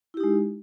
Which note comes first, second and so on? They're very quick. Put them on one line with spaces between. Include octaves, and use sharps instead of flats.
E4 G4 D#4 G#3